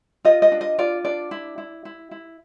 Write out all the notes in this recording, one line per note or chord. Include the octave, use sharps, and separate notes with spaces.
F4 D#5
D#5
D4
D#5
F4 D5
D4 D5
E4
E4
E4
E4